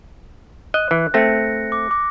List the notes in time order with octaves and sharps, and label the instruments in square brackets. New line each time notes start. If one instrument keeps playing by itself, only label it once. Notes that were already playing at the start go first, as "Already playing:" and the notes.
[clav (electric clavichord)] D#5 [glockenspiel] F#6
[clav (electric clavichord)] E3
[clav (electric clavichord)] A3 C4 [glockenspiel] A#6 C#7
[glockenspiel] D6
D6